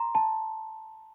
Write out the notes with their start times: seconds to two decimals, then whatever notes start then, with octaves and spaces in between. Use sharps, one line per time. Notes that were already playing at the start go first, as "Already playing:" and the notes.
Already playing: A#5 C6
0.15 A5